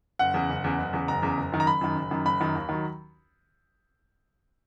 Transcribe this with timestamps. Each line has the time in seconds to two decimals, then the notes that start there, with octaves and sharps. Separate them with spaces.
0.19 F#1 F#5
0.34 E2 C#3
0.49 F#1
0.64 E2 C#3
0.78 F#1
0.93 E2 C#3
1.08 F#1 A#5
1.22 E2 C#3
1.37 F#1
1.52 F#2 D#3
1.60 A#5
1.66 F#1 B5
1.81 F#2 D#3
1.95 F#1
2.11 F#2 D#3
2.25 F#1 B5
2.41 F#2 D#3
2.55 D#2
2.69 D#3 F#3